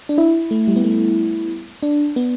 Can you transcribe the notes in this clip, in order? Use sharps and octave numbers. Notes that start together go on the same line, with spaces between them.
D4
E4
A3
G3
B3
A3
D4
B3